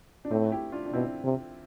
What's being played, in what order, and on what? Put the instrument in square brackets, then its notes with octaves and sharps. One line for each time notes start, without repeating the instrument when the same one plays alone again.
[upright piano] D4
[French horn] A2 [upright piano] A3 C4
[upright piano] E4 G4
D4 F4
D4
[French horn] B2 [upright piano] C4 E4
[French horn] C3